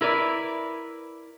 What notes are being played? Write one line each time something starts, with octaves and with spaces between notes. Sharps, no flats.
E4 A#4 B4 D5